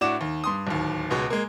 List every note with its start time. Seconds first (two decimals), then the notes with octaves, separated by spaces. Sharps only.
0.01 A2 D4 F#4 D6 E7
0.21 D#2
0.44 G2 C6 D#6
0.67 D1 D#2
1.10 C#2 B2 G#3
1.30 G#3 A#3